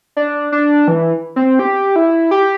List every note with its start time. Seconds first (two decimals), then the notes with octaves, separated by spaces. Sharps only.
0.16 D4
0.52 D4
0.88 E3
1.36 C4
1.59 G4
1.96 E4
2.31 G4